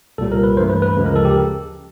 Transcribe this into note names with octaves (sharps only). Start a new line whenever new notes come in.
C2 A#2 G3 A4
A#4
B4
G2 E3 A3 C5
B4
B4
D2 C#3 F3 G#3
A#4
A4
G4